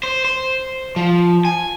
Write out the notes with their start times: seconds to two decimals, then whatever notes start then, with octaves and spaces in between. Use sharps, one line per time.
0.03 C5
0.25 C5
0.96 F3
1.45 G#5